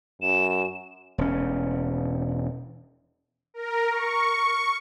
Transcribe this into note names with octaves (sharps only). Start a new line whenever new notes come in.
F#2 E7
E1 C#4
A#4
C#6